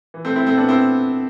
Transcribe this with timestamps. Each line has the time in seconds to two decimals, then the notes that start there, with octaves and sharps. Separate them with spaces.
0.14 E3
0.25 A3 C4
0.35 C4 E4
0.46 A3 C4
0.57 B3 D4
0.68 C4 E4